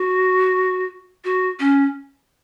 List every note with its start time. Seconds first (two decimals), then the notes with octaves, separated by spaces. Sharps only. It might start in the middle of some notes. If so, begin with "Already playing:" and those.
Already playing: F#4
1.25 F#4
1.60 C#4